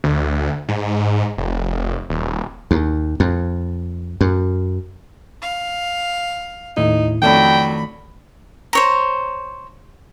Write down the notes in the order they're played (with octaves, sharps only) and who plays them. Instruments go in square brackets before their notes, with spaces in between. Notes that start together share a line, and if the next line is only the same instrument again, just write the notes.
[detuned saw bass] D2
G#2
F1
D#1
[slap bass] D#2
F2
F#2
[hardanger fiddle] F5
[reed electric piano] D#2 A2 E4 [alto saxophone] D#4
[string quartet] F2 F#3 D4 [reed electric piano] D#3 A3 [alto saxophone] G5 [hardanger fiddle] B5
[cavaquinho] C5 C#5 A#5